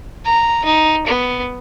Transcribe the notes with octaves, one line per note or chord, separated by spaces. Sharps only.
A#5
D#4
B3